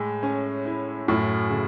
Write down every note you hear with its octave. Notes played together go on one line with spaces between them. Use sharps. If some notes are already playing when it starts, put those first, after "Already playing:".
Already playing: A2 G#3
C#4
E4
F#2 A2
C#3